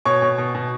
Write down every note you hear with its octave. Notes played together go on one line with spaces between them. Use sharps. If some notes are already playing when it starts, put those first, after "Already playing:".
B2 C#5 C#6
B2
B2
B2